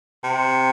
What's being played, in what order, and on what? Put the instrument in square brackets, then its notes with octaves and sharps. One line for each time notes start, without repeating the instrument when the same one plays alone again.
[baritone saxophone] C3